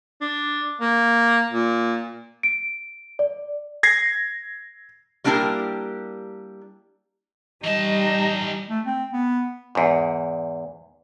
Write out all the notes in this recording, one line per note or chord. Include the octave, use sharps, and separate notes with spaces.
D4
A#3
A#2
D7
D5
G#6 A#6 C7
G3 A#3 D4 E4 G4 A#4
E3 G3 D#4 D#5 A5
A3
C4
B3
E2 G#2